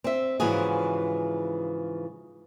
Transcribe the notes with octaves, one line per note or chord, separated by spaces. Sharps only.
C4 E5
G#2 C#3 E3 F3 F#4 G#4